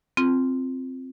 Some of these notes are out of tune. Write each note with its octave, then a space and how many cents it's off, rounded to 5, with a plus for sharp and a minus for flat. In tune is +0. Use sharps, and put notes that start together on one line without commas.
C4 +0 F4 +0